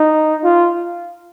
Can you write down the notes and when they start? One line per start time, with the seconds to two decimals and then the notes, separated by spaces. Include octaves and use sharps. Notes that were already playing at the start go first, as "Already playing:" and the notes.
Already playing: D#4
0.44 F4